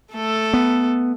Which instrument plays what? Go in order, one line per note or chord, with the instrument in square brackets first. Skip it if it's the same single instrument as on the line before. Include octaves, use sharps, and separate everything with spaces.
[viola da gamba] A3 A4
[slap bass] B3